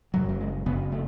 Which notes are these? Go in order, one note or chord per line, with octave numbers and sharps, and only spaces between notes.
F#1 F#2 C#3 F#3
F#3
G#3
F#1 F#2 C#3 B3
A3